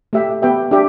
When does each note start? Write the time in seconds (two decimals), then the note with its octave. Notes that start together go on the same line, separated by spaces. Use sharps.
0.13 A3 G4 E5 G5
0.42 B3 G4 B4 E5 G5
0.71 D4 G4 E5